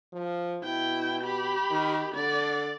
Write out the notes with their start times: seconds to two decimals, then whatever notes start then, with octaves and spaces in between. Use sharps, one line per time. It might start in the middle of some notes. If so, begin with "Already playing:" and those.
0.12 F3
0.63 B2 E4 G5
1.22 G4 B5
1.70 D#3
2.15 D3 D5